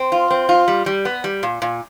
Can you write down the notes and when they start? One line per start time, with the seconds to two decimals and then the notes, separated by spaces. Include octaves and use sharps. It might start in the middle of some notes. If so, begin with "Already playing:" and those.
Already playing: C4
0.12 F4
0.31 C4
0.49 F4
0.68 G3
0.86 G3
1.05 B3
1.24 G3
1.43 A#2
1.62 A#2